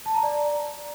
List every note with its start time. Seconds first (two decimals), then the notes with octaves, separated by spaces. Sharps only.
0.06 A5
0.14 A#5
0.23 D5